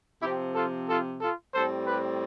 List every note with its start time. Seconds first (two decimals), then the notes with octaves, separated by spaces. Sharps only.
0.22 C3 F3 C4 E4 G4
0.55 F4 A4
0.88 F4 A4
1.21 F4 A4
1.54 A2 G3 C4 A4 C5
1.87 G4 B4